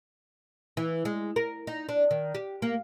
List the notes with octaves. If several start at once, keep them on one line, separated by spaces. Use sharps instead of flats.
E3
G#3
A#4
D#4
D4
D#3
G4
A#3